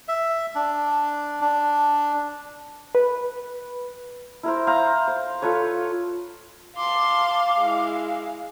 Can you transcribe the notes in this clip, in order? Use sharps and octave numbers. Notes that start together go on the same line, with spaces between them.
E5
D4
D4
B4
E4 A#4 C5
C5 F5 A#5
C5
F4 A4 B4 C#5
F5 A5 C6 D6
G#3 E4